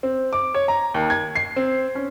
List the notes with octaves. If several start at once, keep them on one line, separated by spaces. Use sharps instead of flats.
C4
D6
C#5
A#5
D#2
G#6
C7
C4
C#4